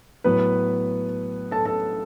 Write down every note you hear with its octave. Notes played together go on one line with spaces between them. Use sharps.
A2 F#3 B3 B4
A4 A5
A4 A5